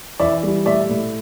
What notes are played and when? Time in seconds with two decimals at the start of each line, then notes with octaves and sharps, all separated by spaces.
0.20 E3 D5 E5
0.43 G3
0.66 A2 D5 E5
0.89 A2